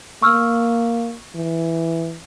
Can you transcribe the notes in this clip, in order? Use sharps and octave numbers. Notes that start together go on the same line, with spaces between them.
A#3 C#6 E6 F6
E3